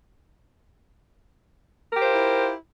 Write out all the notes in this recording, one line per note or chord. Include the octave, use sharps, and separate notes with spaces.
E4 F4 G4 A#4 C5